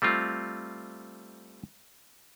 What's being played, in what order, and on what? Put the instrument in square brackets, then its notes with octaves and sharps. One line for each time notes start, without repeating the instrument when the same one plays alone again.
[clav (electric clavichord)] G3 A3 C4 F4